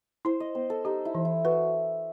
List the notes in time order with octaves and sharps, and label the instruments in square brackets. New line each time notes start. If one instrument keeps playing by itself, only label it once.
[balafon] E4 [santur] C5
[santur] D#5
[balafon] B3 [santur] C5
[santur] A4
[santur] D#4 [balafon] G4
[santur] E4
[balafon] E3
[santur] E4
[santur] F#4 [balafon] B4